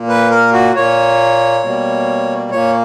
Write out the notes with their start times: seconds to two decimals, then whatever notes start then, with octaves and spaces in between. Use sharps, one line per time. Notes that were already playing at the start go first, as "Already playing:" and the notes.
Already playing: A#2 A#3
0.09 B4
0.31 A#4
0.53 F#4
0.75 A#2 A#3 C#5
1.63 B2 G3 A#3
2.51 A#2 A#3 C#5